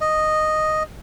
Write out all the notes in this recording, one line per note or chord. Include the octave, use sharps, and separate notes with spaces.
D#5